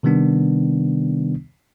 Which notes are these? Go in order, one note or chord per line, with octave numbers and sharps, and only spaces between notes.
C3 D#3 G3 B3 D4